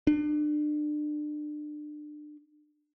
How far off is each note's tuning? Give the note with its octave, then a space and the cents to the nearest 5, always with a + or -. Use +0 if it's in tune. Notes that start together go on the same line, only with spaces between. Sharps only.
D4 +30